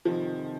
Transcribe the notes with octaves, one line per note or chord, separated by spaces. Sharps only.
F2 C3 D#3 F3